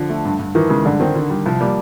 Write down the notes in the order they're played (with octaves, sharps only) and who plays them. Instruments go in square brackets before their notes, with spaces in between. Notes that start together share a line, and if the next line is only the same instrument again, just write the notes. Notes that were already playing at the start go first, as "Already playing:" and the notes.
Already playing: [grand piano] D3 [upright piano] F3
[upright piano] A3
G2
G2
[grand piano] D#3 [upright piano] E3
[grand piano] C#3 [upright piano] G#3
[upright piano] G2 [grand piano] D3
[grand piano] D#3 [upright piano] C4
[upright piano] D3
G3
[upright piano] C2 [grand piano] F3
[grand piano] G3 [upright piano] A#3